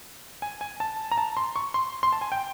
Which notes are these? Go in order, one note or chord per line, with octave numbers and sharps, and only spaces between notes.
G#5
G#5
A5
A#5
A5
C6
C#6
C6
C6
A5
G#5
G5